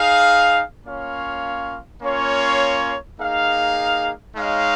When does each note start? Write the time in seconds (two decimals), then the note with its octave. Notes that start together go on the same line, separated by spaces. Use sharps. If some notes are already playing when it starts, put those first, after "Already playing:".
Already playing: D#4 G#4 F5
0.86 A#3 C#4 F4 C#5 F5
2.02 A#3 C#4 F4 C#5
3.19 A#3 D#4 G#4 F5
4.35 G#3 D#4 C#5 F5